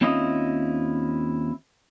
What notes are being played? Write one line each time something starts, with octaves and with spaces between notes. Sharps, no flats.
D#2 C4 C#4 E4 F4 D#5